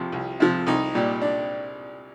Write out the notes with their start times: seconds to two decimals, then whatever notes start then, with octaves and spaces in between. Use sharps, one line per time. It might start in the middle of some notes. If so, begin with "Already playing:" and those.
Already playing: C2 C3 F3
0.12 C2
0.40 C3 F3
0.67 C2 D#4
0.95 A#2 G3
1.22 D4